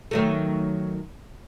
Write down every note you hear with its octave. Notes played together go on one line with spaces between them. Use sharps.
D#3 F#3 A3